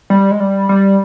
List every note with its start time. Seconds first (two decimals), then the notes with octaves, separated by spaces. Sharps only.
0.10 G3
0.31 G#3
0.40 G3
0.69 G3